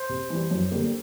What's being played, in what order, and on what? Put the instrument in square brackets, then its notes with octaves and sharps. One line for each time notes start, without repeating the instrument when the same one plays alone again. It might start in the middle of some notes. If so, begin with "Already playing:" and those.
Already playing: [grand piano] C5
C3
E3 G3
F#2
D3 G3 A#3